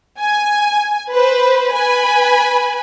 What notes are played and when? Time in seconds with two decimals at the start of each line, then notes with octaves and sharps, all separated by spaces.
0.20 G#5
1.11 B4 C5
1.70 B4 G#5 B5